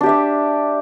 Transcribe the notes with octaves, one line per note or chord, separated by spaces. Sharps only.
D4 G4 D5 E5